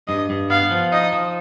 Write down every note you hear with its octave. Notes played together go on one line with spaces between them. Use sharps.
G2 D#5
G2
B3 F5
F3
D#4 D#5
F3